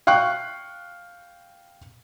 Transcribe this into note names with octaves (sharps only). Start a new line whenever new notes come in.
F5 G5 C#6 F#6